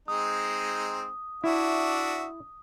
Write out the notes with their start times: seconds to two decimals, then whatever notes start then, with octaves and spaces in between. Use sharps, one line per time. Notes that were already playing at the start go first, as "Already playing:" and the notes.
0.08 G#3 C4 D#4 D#6
1.44 D4 E4 F#4 E5